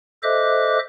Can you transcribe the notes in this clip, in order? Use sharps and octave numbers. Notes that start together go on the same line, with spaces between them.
A4 C5 D#5 E5 D6 F#6